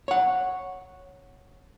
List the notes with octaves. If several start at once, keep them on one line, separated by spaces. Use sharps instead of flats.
C#5 F#5